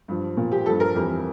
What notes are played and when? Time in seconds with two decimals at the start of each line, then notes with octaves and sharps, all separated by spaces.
0.08 G2 F3
0.37 A#2 F3
0.52 G4
0.66 G2 F3 A4
0.80 A#4
0.95 F2 E3 G3